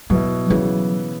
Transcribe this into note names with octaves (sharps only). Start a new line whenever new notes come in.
B2 F#3 B3 E4
C#3 E3 F#3 B3 E4